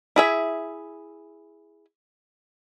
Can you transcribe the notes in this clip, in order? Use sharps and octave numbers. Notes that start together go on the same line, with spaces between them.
E4 G#4 E5